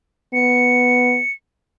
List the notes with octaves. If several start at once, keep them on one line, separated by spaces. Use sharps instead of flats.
B3 C#7